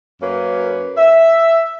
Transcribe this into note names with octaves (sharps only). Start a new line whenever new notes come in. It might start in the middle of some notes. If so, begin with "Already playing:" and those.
F#2 A#3 C#4 B4 C#5
E5